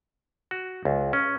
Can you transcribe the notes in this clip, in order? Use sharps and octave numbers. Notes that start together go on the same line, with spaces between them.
F#4
C#2
C#4